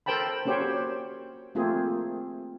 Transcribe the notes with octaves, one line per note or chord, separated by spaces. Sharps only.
A4 A#4 C5 G5 A5 B5
A#3 C#4 F#4 G4 C5 C#5
A3 A#3 C4 F4 G#4